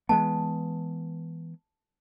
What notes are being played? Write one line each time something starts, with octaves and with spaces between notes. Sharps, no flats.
E3 G#3 B3 A5